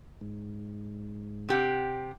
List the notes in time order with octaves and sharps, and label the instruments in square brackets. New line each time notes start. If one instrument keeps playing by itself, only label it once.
[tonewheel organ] G#2
[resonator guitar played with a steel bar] C3 G4 F#5